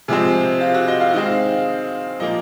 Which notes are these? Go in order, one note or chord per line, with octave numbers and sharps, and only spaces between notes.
C3 F3 G#3 C4 G#4
F4
F#4
D#5
F5
D#3 G#3 C4
A#2 F3 A#3 D#5